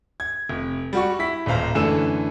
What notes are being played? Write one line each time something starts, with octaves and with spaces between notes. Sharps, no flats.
G#6
F1
G3 F#4 C#6
E4 B6
D#1 A1 C5 F5 A#5
F#2 D3 E3 A3 A4 E7